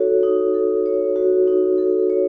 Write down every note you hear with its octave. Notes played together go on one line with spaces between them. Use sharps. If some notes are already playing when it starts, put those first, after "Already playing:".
Already playing: D#4 F#4 A4 C#5
D#4
A4
C#5
F#4
D#4
A4
C#5